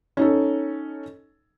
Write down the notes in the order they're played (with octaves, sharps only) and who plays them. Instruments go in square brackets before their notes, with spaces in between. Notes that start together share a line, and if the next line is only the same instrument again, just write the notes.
[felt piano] C#4 D#4 A4